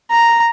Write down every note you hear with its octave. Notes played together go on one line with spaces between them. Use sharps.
A#5